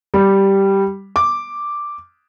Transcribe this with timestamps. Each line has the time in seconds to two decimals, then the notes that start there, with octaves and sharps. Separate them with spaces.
0.14 G3
1.16 D6